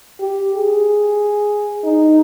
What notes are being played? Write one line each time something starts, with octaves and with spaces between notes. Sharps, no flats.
G4
G#4
D#4